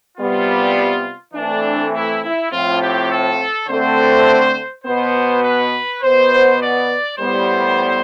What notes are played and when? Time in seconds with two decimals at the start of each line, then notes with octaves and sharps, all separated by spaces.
0.18 C3 G3 B3 F4
1.34 E3 A3 C4 D4
1.94 E4
2.23 E4
2.51 A2 F3 C4 F4
2.81 G4
3.10 A4
3.68 D3 A3 C4 C5
4.85 B2 B3 C5
5.44 B4
6.02 B2 B3 C5
6.61 D5
7.18 A2 G3 B3 C5